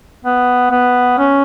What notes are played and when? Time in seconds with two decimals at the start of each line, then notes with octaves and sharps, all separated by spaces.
0.25 B3
0.71 B3
1.18 C#4